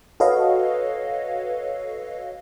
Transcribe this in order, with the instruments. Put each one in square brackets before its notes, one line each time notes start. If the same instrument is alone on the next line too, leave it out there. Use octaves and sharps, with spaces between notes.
[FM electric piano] F#4 A4 B4 C#5 D#5 F5